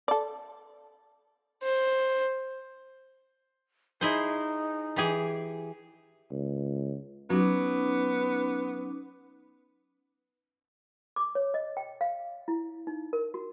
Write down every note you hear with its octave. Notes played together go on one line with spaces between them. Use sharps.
A4 D5
C5
D#4 E4 G#4 C5
E3 G4 G#4
C#2
F#3 B3 C#4 D#4 F#4 D6
D6
C#5
D#5
G5
F5
E4
D#4
A#4
F#4